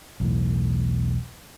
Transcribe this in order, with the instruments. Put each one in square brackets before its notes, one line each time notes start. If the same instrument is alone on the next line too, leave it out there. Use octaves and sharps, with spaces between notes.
[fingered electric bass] B1 E2 A2